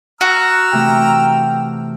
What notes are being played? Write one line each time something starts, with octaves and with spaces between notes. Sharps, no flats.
F#4 A#5 E6 F6
C3 E3 A3 G5